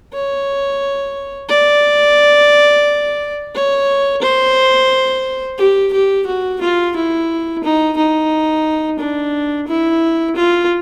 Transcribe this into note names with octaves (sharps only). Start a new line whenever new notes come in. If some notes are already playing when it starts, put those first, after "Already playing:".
C#5
D5
C#5
C5
G4
G4
F#4
F4
E4
D#4
D#4
D4
E4
F4